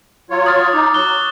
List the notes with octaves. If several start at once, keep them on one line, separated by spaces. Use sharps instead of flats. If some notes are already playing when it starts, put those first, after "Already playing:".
F#3 F4 C#5
D#6 F6 A6
D#4 D6
F#3 C#6 F#6 G7